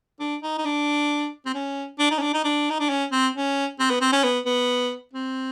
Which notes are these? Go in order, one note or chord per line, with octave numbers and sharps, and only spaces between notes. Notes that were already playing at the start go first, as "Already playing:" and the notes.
D4
D#4
D#4
D4
C4
C#4
D4
D#4
C#4
D4
D#4
D4
D#4
D4
C#4
C4
C#4
C4
B3
C4
C#4
B3
B3
C4